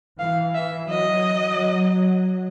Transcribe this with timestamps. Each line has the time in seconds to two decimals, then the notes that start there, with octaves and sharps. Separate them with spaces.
0.19 E3 F5
0.54 E5
0.89 F#3 D#5